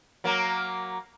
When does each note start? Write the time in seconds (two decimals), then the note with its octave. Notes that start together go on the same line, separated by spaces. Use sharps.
0.24 F#3 A#3